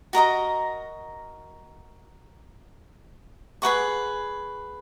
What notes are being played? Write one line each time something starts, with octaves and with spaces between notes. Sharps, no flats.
F#4 A#4 D#5 A#5
G#4 B4 F#5 C#6